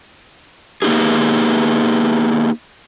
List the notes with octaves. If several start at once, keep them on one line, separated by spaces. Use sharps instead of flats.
A#3 B3 D#4 G4 G#4